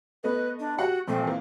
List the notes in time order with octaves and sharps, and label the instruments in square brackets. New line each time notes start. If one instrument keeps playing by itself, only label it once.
[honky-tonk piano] A3 B3 D#5 [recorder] B4
[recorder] D4
[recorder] F#4 [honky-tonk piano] G4 F#5
[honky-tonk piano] A#1 A#2 A3 [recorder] C4
[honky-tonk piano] E3 A#3